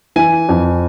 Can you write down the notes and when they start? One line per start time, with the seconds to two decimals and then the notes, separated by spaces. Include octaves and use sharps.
0.16 E3 G#5
0.49 F2